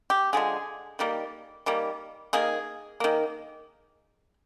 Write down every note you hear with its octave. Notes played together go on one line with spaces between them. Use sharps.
G4
D3 F3 G#3 G#4
D#3 G3 A#3
D#3 G3 A#3
D#3 A#3 G#4
D#3 A#3